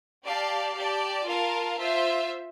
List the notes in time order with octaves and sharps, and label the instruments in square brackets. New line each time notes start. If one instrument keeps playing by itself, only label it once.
[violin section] G4 D5 F5 A5
G4 D5 A5
F4 A#4 F5 A5
F4 C5 E5